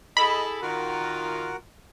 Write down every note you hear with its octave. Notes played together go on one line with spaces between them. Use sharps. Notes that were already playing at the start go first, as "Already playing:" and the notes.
E4 G#4 A4 D#5 B5
D#3 F4 F#4 A#4 F#5